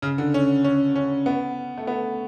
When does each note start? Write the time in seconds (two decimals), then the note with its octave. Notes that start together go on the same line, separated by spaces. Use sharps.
0.02 C#3
0.18 D3
0.34 C#4
0.64 C#4
0.95 C#4
1.26 B3
1.78 A3
1.87 B3